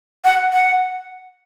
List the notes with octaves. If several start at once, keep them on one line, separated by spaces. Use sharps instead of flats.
F#5
F#5